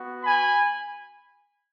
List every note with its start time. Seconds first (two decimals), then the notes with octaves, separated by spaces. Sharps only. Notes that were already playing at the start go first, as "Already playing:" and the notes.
Already playing: B3 F#4
0.24 G#5 B5